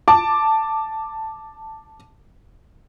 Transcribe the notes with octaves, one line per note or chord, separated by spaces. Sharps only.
A5 D6